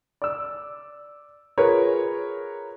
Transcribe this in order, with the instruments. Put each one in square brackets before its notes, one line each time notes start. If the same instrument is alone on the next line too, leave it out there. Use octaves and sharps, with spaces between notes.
[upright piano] D5 E6
F4 G#4 A#4 B4 C#5